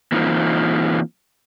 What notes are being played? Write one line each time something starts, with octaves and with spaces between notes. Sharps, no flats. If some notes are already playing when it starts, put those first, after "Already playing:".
E3 A#3 C4 D#4 F4